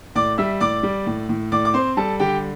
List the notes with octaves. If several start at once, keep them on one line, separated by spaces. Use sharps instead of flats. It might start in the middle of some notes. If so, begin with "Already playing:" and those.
A2 D5 D6
G3 E5 E6
A2 D5 D6
G3
A2
A2
A2 D5 D6
D6
C4 C5 C6
G3 A4 A5
D3 G4 G5